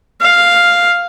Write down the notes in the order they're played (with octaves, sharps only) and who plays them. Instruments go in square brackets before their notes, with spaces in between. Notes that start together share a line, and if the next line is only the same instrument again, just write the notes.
[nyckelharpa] F5